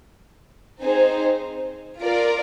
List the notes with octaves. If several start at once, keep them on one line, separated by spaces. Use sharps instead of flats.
C4 D#4 G#4 C5
F4 A#4 D5